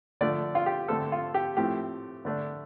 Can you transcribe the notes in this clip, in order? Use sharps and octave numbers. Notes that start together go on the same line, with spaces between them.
D3 F3 A3 D4 D5
F4
G4
D3 A3 C4 A4
F4
G4
A2 F3 A3 C4 G4
D3 A3 D4